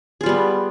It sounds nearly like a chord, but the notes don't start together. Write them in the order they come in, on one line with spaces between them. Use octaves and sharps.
G#4 F4 G3 B3